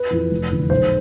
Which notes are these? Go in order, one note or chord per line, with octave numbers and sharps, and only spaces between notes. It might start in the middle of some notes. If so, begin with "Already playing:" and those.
Already playing: B4
F2 E3
F1
E2 D3
B1 C5